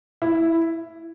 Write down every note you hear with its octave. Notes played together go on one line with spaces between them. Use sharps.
E4